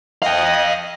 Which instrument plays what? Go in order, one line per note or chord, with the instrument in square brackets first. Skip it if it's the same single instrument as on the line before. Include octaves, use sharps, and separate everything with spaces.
[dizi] D#5 [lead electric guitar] F5 G5